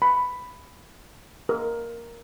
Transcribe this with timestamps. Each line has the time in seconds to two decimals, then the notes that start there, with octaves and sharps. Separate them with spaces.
0.02 B5
1.49 A#4